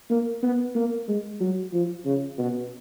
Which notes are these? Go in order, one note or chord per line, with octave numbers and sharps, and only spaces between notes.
A#3
B3
A#3
G#3
F#3
F3
C#3
B2